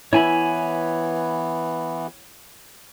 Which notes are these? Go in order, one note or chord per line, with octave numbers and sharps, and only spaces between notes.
E3 B3 E4 C#5 G#5 B5